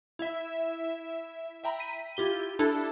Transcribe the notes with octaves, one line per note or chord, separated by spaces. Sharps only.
E4 E5
E5 G5 A#5 B5
B6 D#7
E4 F4 G4 G7
D4 E4 A4 A5 E6